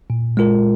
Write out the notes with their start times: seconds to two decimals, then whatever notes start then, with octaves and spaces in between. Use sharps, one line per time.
0.10 A#2
0.37 G#3 F4 A#4